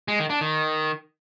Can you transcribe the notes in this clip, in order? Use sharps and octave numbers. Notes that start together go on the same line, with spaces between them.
G#3
D#3
D4
D#3